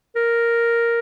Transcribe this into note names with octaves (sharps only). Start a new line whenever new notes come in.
A#4